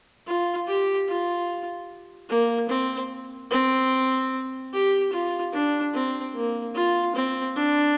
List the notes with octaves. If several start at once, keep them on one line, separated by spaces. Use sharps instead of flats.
F4
G4
F4
A#3
C4
C4
G4
F4
D4
C4
A#3
F4
C4
D4